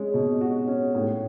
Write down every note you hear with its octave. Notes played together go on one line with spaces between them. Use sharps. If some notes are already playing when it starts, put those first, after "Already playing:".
Already playing: G#3 C#4
B2
F#4
C#4
A2